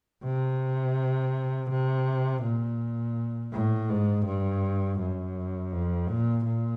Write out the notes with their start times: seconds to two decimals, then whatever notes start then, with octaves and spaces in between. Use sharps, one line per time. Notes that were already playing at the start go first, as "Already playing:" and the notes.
0.24 C3
1.70 C3
2.43 A#2
3.53 A2
3.90 G#2
4.26 G2
4.99 F#2
5.72 F2
6.08 A#2
6.45 A#2